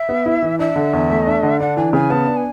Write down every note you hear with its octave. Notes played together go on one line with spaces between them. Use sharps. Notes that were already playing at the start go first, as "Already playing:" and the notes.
Already playing: E5
B3
E4
E3
D4 E5
D3
E2
A3
D4
D3
D4 F#5
E3 G#5
C#3 G#5
B3 A5
D4
G#5